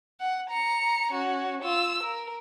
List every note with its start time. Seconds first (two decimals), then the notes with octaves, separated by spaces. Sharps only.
0.20 F#5
0.50 A#5 C#7
1.12 C#4 F#4
1.62 F4 E6
2.03 A#4